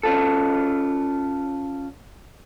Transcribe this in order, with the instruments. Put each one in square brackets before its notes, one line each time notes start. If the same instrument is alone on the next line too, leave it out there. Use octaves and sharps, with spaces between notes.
[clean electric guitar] C#4 F4 A4